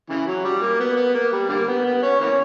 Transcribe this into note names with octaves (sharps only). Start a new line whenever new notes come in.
C#3 E3
F#3
G3
A#3
B3
B3
A#3
G3
D3 G3 A#3
B3
B3
C#4
E3 A#3 C#4